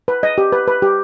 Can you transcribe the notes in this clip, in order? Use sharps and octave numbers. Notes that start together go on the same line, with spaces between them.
B4
D#5
G4
B4
B4
G4